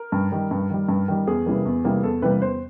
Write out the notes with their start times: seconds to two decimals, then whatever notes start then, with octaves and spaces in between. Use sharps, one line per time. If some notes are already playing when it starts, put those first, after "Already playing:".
Already playing: A#4
0.12 G2
0.32 D#3 G3
0.51 G2
0.70 D#3 G3
0.89 G2
1.08 D#3 G3
1.27 E2 G#4
1.46 C3 E3 G3 A#3
1.65 E2
1.85 C3 E3 G3 A#3
2.03 E2 A4
2.22 C3 E3 G3 A#3 B4
2.41 E2 C5